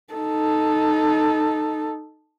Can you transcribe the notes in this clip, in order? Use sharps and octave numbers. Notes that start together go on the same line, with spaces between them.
D#4 A4